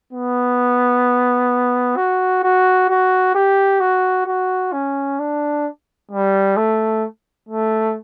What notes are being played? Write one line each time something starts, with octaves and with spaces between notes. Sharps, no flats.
B3
F#4
F#4
F#4
G4
F#4
F#4
C#4
D4
G3
A3
A3